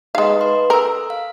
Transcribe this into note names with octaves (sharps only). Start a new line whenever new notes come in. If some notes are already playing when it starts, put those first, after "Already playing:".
G#3 D#4 B4 D#5 F5
B4 C6
A4 A#4 E6
F5